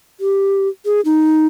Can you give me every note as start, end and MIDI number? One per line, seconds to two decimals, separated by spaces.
0.20 0.68 67
0.85 1.01 68
1.05 1.47 63